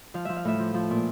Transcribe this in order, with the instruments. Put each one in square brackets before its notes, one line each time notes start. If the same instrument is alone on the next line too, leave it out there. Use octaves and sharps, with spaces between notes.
[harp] F3 F5
F3 E5
F5
A2 E5
F3
F3
A#2